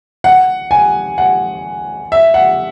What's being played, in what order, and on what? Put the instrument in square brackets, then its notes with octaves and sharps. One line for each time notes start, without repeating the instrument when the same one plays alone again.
[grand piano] F#5
G#5
F#5
E5
F#5